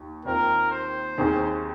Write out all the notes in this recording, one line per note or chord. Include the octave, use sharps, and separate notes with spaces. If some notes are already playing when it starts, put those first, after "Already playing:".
Already playing: D#2
D#2 D#3 C4 F4 A#4
C5
D#2 D#3 C4 G#4